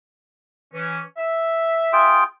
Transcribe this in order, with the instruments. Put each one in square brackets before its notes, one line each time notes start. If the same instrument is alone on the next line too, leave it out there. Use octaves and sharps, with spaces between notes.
[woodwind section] E3 C#4
E5
[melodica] F4 G#4 G5